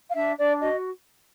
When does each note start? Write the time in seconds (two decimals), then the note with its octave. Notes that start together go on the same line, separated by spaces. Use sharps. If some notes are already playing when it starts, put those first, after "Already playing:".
0.08 F5
0.16 D4 E5
0.38 D4 D5
0.60 F#4 D#5